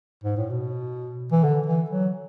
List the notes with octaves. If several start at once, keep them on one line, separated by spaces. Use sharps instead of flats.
G#2
A2
B2
E3
D3
E3
F#3